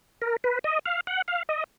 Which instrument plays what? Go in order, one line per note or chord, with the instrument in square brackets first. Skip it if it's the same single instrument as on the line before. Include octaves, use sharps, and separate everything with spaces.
[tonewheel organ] A#4
B4
D#5
F5
F#5
F5
D#5